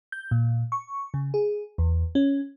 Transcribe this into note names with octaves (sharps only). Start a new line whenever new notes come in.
G6
A#2
C#6
C#3
G#4
E2
C#4